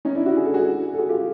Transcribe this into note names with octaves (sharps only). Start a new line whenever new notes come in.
C#4 D#4
D4 E4
E4 F#4
G#4
A4
F#4 G#4
A4
F#4 G#4
F4 G4